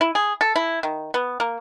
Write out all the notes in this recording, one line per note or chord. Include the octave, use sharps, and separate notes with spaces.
E4
G#4
A4
E4
D#3
B3
A#3